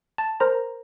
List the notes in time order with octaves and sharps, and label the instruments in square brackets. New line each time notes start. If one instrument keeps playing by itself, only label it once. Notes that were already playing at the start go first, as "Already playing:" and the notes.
[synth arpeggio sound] A5
A#4 C5 A#5